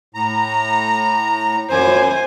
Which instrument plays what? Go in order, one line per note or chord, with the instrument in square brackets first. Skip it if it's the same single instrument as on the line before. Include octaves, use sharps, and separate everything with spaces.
[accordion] A2 A#5
[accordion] F#2 [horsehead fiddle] C5 G#5